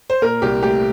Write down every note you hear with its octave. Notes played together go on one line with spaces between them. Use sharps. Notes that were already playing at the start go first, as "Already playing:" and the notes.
C5
A#2 A#4
C2 G4
A3 G4